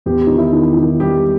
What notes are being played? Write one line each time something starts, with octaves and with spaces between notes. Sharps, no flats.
E2 G4
D#3 D#4
E4
D#3
D#3
G3 G4